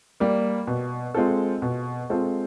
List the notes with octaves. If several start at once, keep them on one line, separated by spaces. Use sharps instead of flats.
G3 A#3
B2
G#3 C4 F4 A4
B2
G#3 C4 F4 A4